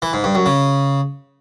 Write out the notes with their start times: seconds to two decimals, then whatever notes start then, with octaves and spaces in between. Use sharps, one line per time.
0.02 E3
0.13 G#2
0.24 G2
0.35 F#2
0.46 C#3